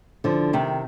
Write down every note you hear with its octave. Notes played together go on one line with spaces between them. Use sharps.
D3 F3
C3 D#3